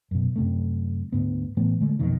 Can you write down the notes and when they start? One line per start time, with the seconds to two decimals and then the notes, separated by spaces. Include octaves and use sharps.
0.11 F#2 B2
0.36 F#2 C3 A3
1.12 D2 G#2 B3
1.57 A2 E3 A3 B3
1.80 D3 G#3 A3
1.99 B1 F2 B2 D#3